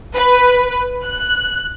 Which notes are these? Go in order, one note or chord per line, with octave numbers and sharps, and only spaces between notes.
B4
F#6